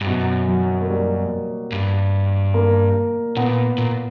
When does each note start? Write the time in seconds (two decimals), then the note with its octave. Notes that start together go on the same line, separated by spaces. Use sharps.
0.01 G2
0.07 F#2 B2
0.48 F#3
0.81 A#3
0.89 G3
1.72 G2
2.54 A#3
3.37 A#2 B3
3.78 A#2